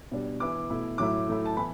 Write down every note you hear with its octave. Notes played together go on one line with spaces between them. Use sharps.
B2 G3 D4
E3 B3 E4 D6
B2 A3 E4
A2 F#3 A3 E4 D6
A2 F#3 A3 E4
A5
E3 B3 B5